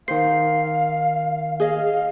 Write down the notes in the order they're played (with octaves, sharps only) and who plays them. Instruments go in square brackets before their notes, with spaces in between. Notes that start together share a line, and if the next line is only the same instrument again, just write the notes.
[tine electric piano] D#3 C7 [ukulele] C5 [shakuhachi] F5
[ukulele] G#4 D#5 [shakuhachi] F5